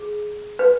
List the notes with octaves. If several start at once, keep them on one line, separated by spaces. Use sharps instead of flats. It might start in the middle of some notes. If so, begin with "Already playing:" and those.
Already playing: G#4
B4